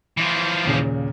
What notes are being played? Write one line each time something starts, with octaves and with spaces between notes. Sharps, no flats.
E3 F3
D#2 A#2 C#3